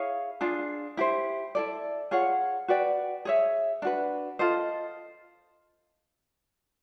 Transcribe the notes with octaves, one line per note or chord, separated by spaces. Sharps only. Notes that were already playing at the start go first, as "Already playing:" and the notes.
Already playing: E4 G#4 C#5 F5
D4 F4 G#4
E4 G4 C5
E4 A4 D5
F4 G#4 C#5 F#5
F#4 B4 D5 G5
G#4 C#5 E5
D4 F#4 B4
F4 A4 C5 D#5